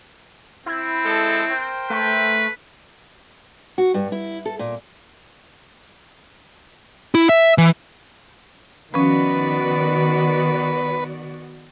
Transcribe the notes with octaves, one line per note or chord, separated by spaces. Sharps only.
C4 E4
G#3 A4
A#4 C5 G5
A3 B4
F#4
G2
E4
A4
A#2
E4
E5
E3
D#3 F3 B3 C#4 F#4 B4 D5